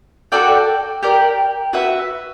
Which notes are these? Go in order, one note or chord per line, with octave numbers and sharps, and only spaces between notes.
F#4 A4 D5 G5
G4 A#4 D5
F#4 B4 E5